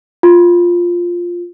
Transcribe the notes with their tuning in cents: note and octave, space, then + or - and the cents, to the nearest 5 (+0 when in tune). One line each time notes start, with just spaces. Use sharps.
F4 +5